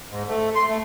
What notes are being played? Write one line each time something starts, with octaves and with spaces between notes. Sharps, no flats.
G#2
A3
C6
A3